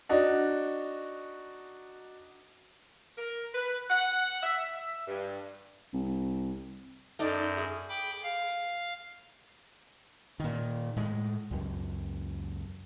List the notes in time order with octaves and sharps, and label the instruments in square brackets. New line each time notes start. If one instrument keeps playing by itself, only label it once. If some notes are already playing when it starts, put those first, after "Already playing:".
[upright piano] D4 D#4 F#4
[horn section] A#4
B4
F#5
E5
E5
G2
[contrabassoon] C2
[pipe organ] F#2 [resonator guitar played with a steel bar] A3 D#4 D5
[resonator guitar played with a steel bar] G#4
[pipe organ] G5 B5 D6
F5
[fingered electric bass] A#2 D#3
A2 G#3
C#2 F#2